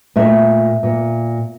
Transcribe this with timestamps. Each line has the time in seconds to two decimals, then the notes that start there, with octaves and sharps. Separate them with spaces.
0.16 A#2 A3 E5
0.83 A#2